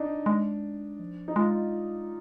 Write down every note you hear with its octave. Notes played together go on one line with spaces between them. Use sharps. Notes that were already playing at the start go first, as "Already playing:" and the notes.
Already playing: D4 D#4
G#3
F3
D#4
G#3 F4